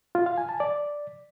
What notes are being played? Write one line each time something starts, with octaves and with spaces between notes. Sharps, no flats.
F4
F5
G#5
A5
D5